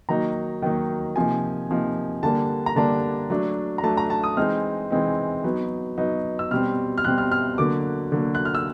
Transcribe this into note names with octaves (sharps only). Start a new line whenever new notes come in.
D#3 F#3 A#3 D#4 A#5
D#3 F#3 A#3 D#4
C3 F3 A#3 D#4 G#5
C3 F3 A#3 D#4
D3 G3 A#3 D4 A5
A#5
D3 G3 A#3 D4 A5
F#3 A3 D4
A#5
F#3 A3 D4 A5
A#5
A5
D#6
E3 G#3 C4 D#4 F6
E3 G#3 C4 D#4
F#3 B3 D#4
F#3 B3 D#4
E6
B2 G3 C4 F6
F6
B2 G3 C4 F#6
F6
F6
D3 F#3 A#3 D6
D3 F#3 A#3
F#6
F6
E6